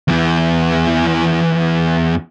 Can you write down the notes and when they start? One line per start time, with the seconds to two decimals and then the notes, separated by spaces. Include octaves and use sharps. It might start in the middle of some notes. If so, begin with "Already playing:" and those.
0.08 E2 E3